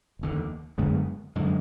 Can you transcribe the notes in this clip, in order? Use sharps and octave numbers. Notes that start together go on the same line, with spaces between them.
F1 D#2 D3
F#2 D3 G#3 B3
F#2 D3 G#3